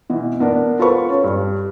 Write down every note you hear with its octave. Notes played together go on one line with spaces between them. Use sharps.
B2 E3
B3 D4 A#4
F4 A4 B4 C5 B5 C#6
C#4
G2